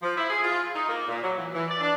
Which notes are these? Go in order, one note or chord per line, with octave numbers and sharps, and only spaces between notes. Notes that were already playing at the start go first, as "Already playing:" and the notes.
F3
E4
G#4
F4
D#4
A#3
A#2
F#3
E3
E3
D5
D4